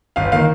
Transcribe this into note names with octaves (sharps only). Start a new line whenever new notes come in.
G1 F5
D#3 A#3 F5